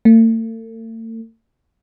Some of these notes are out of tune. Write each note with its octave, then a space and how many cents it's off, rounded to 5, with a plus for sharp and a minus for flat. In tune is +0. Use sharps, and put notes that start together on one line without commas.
A3 +45